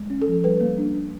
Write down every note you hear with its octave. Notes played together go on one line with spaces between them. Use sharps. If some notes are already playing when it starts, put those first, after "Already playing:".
Already playing: G#3
C#4
A4
F3
G3 B4
A#3
D4
D4